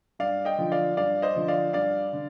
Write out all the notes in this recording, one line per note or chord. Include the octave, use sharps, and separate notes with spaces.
G2 D5 F5
D#5 G5
D3 F3
D5 F5
G2 D5 F5
C5 D#5
D3 F3
D5 F5
G2 D5 F5
D3